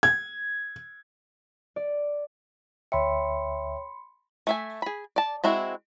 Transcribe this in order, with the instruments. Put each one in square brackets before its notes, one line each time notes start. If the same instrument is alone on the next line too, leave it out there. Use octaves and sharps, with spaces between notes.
[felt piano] G#6
[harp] D5
[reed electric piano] D2 E5 [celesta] C#5 G5 [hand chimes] B5 C6 C#7
[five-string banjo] A3 E5 G#5
G#4 B5
D5 A5
G#3 C4 E4 F#4